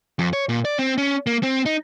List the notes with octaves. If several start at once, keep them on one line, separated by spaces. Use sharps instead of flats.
F2
C#5
A#2
D5
C4
C#4
A#3
C4
D#4